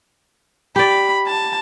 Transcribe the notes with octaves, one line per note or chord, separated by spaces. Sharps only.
G4 D5 B5
A5